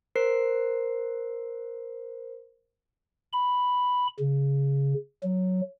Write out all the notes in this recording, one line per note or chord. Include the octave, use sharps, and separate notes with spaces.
A#4 C5 C7
B5
C#3
F#3